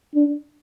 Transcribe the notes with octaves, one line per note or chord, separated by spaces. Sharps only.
D4